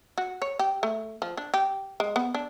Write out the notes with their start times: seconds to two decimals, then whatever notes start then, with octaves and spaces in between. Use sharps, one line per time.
0.18 F#4
0.42 C#5
0.59 G4
0.83 A3
1.22 F3
1.37 D4
1.54 G4
2.00 G#3
2.16 B3
2.35 D4